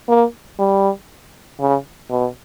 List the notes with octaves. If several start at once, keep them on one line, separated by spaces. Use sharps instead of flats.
A#3
G3
C#3
B2